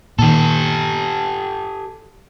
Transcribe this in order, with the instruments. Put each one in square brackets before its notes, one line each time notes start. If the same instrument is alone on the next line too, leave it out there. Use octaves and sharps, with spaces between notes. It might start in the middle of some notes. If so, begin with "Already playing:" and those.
[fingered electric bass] A#2 D#3 [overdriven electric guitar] G4 A4